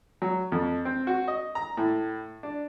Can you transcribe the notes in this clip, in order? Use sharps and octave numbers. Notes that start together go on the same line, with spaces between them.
F#3
F2
C4
F#4
D#5
A#5
A2
D4